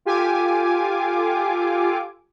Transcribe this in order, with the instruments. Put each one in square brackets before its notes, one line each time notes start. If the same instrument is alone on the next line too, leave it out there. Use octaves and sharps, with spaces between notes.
[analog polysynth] F4 G4 A4 G#5 D6